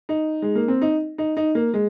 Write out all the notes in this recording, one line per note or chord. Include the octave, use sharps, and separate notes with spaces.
D#4
G#3
A#3
C4
D#4
D#4
D#4
A#3
G#3